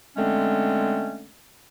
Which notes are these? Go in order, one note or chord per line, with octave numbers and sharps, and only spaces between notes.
D3 G#3 A3 C4 C#4